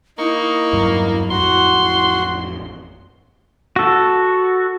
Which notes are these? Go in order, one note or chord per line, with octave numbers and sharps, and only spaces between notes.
A#3 D#4 E4 C#6
E2 G2 F#3
A1 F2 F#4 C6
F#4 A4